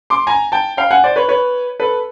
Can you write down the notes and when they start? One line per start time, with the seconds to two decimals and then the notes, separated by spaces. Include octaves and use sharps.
0.10 C6 D6
0.27 G#5 A#5
0.52 G5 A5
0.77 F5 G5
0.91 F#5 G#5
1.04 C5 D5
1.16 B4 C#5
1.29 B4 C#5
1.80 A4 B4